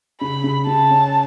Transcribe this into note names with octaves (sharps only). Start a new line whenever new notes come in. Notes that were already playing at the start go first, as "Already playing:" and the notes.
C#3 B5
C#3
C#3 A5
C#4